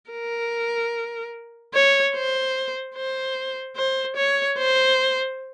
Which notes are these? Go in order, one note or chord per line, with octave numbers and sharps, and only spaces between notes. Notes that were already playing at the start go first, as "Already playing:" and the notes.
A#4
C#5
C5
C5
C5
C#5
C5